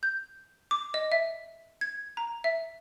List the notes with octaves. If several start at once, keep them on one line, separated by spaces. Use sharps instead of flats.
G6
D6
D#5
E5
G#6
A#5
E5